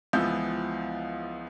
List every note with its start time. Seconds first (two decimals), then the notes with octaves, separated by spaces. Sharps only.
0.13 C#2 E3 F3 B3 E6 G6